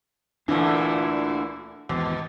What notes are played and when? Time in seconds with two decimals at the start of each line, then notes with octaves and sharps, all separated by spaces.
0.48 D2 A#2 D3 E3 D4
1.89 G#1 E2 B2